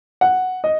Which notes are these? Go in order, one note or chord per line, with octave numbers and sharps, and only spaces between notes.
F#5
D#5